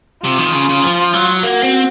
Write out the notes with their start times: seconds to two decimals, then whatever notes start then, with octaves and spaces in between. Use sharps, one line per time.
0.24 C3 F4
0.38 D#3
0.54 C#3
0.69 C#3
0.83 F3
1.13 F#3
1.43 A#3 F#4
1.63 C4